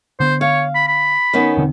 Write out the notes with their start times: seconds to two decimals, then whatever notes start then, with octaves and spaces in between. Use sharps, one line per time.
0.20 D3 B3 C5
0.41 C#5 F5
0.75 B5
0.88 B5
1.33 D#3 B3 C#4
1.57 E1 D3 C4